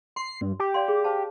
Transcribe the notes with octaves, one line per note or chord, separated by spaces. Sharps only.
C6 C7
G2
G4
D5 F5 C6
G#4
C5 F5 A5